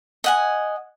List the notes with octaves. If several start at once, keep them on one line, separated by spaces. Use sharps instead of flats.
D#5 F#5 G#5